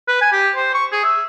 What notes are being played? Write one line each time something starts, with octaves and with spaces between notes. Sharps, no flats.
B4
G#5
G4
C5
C#6
G#4
E5